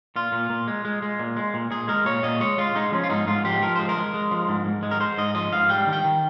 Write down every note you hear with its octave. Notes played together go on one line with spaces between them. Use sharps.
A#2 F4
A#2
A#2
G#3
G#3
G#3
A#2
G#3
A#2
A#2 G#4
G#3 A#4
A#2 C#5
A#2 D#5
G#3 C#5
G#3 F4
G#3 D#4
F3 C#4
F4
G#2 D#4
G#2 F4
F3 G4
F3 A#4
G#3 C5
A#4
G#3
G#3
F3
G#2
G#2
G#3
A#4
G#3 C5
G#2 D#5
F3 D#5
G#2 F5
G3 G5
D#3
G5
D#3